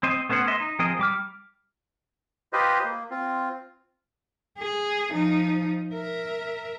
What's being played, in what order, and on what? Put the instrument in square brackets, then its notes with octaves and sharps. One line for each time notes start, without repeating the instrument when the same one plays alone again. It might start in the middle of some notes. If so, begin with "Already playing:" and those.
[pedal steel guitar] C4 C5 D#5
A3 B3 C#4 C5 F#5
D#5 E5 C6
D#4
F3 C4 G#4 A#4 D#5
G3 D6 F6
[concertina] F4 G4 B4 C5 D#5
A#3
C4 F4
[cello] G#4
F3 D#4
A#4 E5